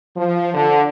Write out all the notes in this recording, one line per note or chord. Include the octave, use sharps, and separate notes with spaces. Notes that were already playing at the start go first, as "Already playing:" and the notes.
F3
D3